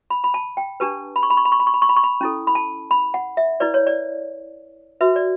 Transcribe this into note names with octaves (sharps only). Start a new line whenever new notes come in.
B5
B5
A5
G5
D4 G4 B4 A5
B5
C#6
B5
C#6
B5
C#6
B5
C#6
B5
C#6
B5
C#6
B5
C#4 E4 A4
B5
A5
B5
F#5
E5
E4 B4 D5
C#5
D5
F#4 B4 E5
D5